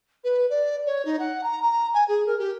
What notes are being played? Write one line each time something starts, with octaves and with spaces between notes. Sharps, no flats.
B4
D5
C#5
D#4
F#5
A#5
A#5
G#5
G#4
A#4
G4